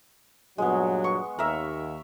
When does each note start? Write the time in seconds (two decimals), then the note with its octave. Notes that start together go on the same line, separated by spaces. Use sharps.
0.58 G2 A#2 F#3 G#3 B3
1.04 C#6
1.39 D#2 A#4 E5